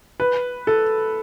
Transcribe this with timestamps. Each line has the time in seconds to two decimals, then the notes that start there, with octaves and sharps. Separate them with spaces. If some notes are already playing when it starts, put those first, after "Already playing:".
0.20 B4
0.67 A4